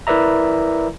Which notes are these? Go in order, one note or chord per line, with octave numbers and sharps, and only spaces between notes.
E4 A#4 B4 D5 E5 A#5